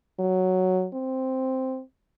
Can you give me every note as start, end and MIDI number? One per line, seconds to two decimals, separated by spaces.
0.20 0.87 54
0.94 1.81 60